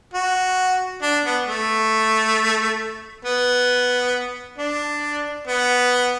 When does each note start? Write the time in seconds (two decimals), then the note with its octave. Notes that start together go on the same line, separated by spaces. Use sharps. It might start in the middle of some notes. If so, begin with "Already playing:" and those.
0.14 F#4
1.02 D4
1.25 B3
1.47 A3
3.25 B3
4.58 D4
5.47 B3